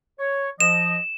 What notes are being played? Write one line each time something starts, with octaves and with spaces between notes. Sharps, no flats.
C#5
F3 D#5 E7